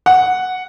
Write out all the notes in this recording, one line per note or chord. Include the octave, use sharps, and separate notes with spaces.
F#5